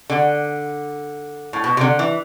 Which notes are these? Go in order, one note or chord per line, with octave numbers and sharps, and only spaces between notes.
D3
A2
B2
C3
D3
E3